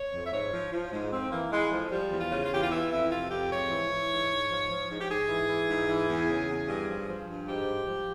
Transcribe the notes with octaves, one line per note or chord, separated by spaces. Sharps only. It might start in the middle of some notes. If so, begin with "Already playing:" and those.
Already playing: C#5
F2
E5
G#2 C#5
F3
F3
G#2
F2 C4
E3 A#3
E3 G#3
F2 F3
F3 G3
E2
F4
C#3
F4
E2 G4
F4
E3 E4
F2 E4
C3 F4
F2 G4
G#2 C#5
E3
E3
G#2
G#2
F3
F3
G#2
G4
G#2 G#4
E3
E3
G#2
E3
E2
C#3
E2
G2
F3
F3
G2
G#2 G4
F3
F3